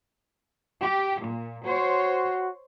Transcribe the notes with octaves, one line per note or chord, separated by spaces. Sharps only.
G4
A#2
F#4 C5 C#5